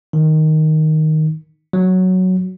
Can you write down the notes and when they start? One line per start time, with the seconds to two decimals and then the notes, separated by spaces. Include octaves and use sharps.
0.13 D#3
1.73 F#3